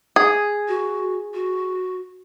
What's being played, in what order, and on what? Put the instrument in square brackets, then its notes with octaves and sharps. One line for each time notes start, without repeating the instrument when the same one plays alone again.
[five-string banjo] G#4
[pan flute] F#4
F#4